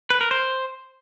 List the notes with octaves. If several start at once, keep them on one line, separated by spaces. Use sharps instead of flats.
B4
A#4
C5